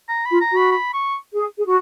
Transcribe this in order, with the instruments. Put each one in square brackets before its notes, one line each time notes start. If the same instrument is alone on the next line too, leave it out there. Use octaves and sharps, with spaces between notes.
[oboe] A#5
[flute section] F4 [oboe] B5
[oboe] A#5
[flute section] F#4
[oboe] B5
B5
C#6
[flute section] G#4
G#4
F#4